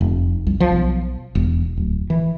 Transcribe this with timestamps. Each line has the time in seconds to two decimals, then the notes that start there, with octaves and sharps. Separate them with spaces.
0.01 F1
0.47 C2
0.60 F3
0.72 B1
1.35 E1
1.77 D1
2.10 E3